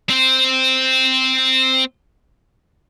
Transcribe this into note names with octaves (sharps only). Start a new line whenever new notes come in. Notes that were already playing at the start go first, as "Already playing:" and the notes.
C4 C5